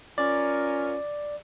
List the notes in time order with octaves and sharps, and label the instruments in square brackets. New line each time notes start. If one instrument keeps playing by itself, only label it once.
[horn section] C#4 F4 A#4 [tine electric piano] D5